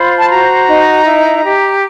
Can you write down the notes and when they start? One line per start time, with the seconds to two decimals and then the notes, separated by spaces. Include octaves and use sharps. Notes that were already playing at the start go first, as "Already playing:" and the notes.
Already playing: F4 C5 B5
0.19 A5
0.29 F#4 A#5
0.67 D#4
1.05 E4
1.43 G4